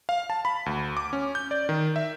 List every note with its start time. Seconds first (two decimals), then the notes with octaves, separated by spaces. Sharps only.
0.09 F5
0.30 A5
0.45 B5
0.66 D2
0.97 D6
1.13 C#4
1.35 G6
1.51 D5
1.69 D#3
1.96 E5